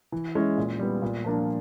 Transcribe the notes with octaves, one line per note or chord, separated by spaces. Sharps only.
E3
G#3 C#4 E4
A#2
G3 B3
A#2
F3 A#3 D4